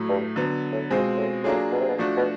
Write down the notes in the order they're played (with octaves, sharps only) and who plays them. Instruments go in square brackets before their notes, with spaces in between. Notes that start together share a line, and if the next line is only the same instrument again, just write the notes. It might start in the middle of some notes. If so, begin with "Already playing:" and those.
Already playing: [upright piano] A2 F#3 A3
[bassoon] G2
[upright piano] D3 F#3 B3
[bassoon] A2
[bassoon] G#2 [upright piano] B2 G#3 C4 F4
[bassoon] A2
[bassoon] A2 [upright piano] F#3 A#3 D4 F4 G#4
[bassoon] B2
C3
B2
[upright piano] F3 A3 D4 F#4
[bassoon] B2